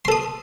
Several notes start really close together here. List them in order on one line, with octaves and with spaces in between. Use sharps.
C6 A4 D#6